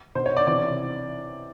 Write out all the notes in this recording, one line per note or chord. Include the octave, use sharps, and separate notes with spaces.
B2 C5
C#5
D5
C3 E3 D5